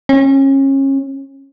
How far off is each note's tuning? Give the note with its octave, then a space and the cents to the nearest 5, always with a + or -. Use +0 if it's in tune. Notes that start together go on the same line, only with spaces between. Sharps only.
C#4 -30